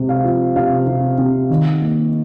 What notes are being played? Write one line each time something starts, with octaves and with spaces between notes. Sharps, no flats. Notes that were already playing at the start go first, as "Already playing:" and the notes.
Already playing: C3 G#3
F5
F3
C3 F5
C3
C3
D#3
A#3